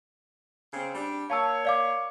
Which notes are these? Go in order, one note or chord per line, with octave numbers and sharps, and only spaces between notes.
C#3 C4
G3 D4
A#3 C#5 F5 A5 E6
D5 F5 D6